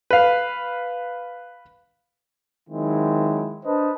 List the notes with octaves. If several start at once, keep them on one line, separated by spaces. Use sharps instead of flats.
B4 F5
D#3 F#3 G#3 C4 E4
D4 B4 C5 D#5 A5